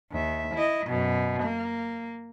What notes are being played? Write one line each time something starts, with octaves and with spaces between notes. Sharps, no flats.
D#2 E5
E4 D#5
F#2 B2
A#3